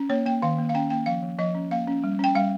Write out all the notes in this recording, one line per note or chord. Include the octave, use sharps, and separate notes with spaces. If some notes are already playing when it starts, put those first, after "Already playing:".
Already playing: C#4
A#3 C#5
A#3 G5
D#3 F5
A#3
F5
C#4 G5
A#3 G5
F3 F5
F3
F3 D#5
C#4
A#3 F5
C#4
G3
C#4 G5
G3 F5